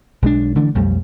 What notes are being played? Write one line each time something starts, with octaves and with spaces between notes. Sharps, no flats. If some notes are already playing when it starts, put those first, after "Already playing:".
B1 G#3 D4
D3 E3 A3 D4
B1 F2 G3 A3